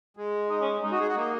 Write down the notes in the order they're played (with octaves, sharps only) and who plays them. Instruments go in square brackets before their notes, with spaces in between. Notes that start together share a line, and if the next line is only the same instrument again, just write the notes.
[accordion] G#3
[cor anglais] D#4
C#4
[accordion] G#3 [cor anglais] D#4
[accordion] F#4
G#4
F#4
[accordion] A#3 [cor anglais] D#4